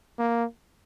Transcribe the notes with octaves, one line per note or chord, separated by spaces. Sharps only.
A#3